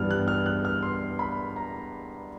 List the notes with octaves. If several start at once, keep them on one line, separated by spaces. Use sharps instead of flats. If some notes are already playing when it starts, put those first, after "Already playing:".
Already playing: G2 E3 G3 B3 F6
F#6
F6
F#6
F6
C6
B5
A#5